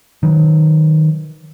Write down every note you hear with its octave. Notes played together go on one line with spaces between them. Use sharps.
D#3 F#3